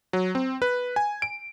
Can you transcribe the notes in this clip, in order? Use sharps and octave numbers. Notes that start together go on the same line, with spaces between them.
F#3
C4
B4
G#5
D7